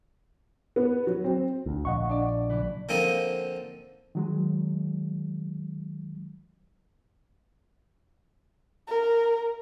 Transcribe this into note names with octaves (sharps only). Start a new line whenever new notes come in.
B3
F#3
C4
D2
A#1 D#5 F#5 C#6
D4 D5
C#3 E3 F#3 B4
D3 F3 A#3 C4 D#4
D#3 F#3 G#3
A#4